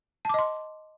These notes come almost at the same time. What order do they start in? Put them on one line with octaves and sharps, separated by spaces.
A5 D6 D#5 C6